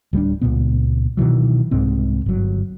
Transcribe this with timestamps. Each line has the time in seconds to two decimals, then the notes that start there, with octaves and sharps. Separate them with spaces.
0.13 D1 G3 G#3 D4
0.41 C#2 F#2 A#2 B3
1.17 B2 D#3 E3 F#3
1.71 C2 G#2 G#3 C4
2.26 G1 F#3